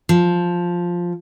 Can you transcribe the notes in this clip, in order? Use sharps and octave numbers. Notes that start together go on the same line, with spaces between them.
F3